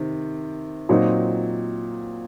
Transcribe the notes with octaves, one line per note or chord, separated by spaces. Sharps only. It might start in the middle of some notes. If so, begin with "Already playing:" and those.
Already playing: C3 D#3
A#2 F#3 C4 D#4